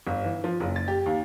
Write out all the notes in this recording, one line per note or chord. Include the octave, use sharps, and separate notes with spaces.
G1
E3
F3
F#1
A6
G4
D#2